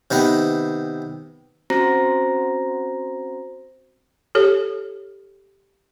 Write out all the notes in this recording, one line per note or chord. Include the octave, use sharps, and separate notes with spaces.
C3 D#3 B3 B4
C4 C#4 F#4 C5 A#5 A#6
G4 A4 C#5